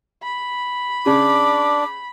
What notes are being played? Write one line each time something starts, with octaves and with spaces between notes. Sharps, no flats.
B5
C#3 D4 D6